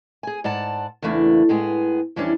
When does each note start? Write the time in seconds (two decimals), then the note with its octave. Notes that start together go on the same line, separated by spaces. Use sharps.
0.23 G#4 G#5
0.44 G#2 D5 F#5 A5
1.02 E2 C#3 E3 A3 A#3 D4
1.49 A2 G#3 B3 G#4
2.16 F2 E3 G3 C#4 D4 C#5